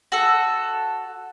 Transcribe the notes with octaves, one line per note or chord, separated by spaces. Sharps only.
F#4 A4